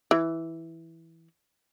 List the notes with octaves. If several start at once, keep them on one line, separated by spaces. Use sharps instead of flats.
E3